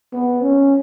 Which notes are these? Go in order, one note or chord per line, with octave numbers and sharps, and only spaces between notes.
B3
C#4